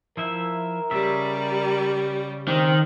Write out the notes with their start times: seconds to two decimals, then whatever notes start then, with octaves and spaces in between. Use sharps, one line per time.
0.17 F3 E4 A#4 E5
0.91 C#3 G3 G4 E5
2.48 D#3 C4